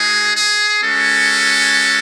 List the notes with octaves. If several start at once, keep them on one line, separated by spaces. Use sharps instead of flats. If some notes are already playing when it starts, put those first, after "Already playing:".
Already playing: G#3 D#4 F#4 G#4
G#4
G#3 C#4 F#4 A4